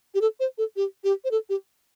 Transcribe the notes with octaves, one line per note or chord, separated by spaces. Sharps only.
G4
A4
C5
A4
G4
G4
C5
A4
G4